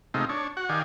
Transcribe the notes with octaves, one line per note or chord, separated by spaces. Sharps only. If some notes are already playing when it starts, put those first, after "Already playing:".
C3 G#3 A3 D#4 F4
D4 C#5
F#4 F#5
D#3 G4 D5 F5 G#5